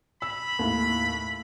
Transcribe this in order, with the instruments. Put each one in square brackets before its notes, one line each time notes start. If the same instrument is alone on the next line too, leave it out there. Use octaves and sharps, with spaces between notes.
[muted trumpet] B5 [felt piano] E6
[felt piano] D#2 A2